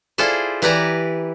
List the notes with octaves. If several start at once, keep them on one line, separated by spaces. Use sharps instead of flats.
E4 F4 G#4 A4 C5 D5
E3 E4 G4 B4 D5 A#5